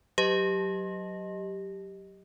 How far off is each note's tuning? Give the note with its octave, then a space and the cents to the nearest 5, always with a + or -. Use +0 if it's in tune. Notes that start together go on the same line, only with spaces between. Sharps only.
F#3 +0 G4 +0 D#5 +0